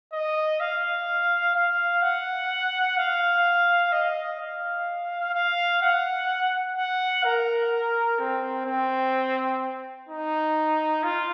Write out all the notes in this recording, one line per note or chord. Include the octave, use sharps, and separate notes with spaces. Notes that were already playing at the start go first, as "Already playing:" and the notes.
D#5
F5
F5
F#5
F5
D#5
F5
F5
F#5
F#5
A#4
C4
C4
D#4
F4